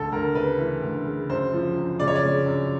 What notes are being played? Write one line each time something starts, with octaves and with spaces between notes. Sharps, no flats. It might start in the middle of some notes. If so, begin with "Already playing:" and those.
Already playing: D2 A4
D2 A#4
C#3 B4
E3
D2
C#3
F#2 C5
F3
F#2
C#3 D5
C#5
D5
C#3
F#2